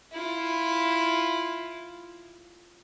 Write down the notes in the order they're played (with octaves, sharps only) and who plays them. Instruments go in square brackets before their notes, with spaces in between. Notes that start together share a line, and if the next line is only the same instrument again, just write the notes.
[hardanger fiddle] E4 F4